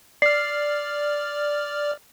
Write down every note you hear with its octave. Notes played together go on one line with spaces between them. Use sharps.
D5 F6 C7